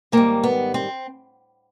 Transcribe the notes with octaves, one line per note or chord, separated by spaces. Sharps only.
G#2 D#3 G3 A#3
B3
C4